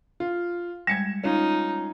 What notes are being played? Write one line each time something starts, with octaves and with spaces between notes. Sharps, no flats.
F4
G3 G#3 G#6 C#7 E7
C#4 D#4 F4